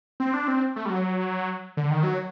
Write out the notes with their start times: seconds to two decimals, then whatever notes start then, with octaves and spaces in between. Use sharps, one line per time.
0.20 C4
0.34 D4
0.48 C4
0.76 A3
0.85 G3
0.90 F#3
1.77 D3
1.91 D#3
2.03 F#3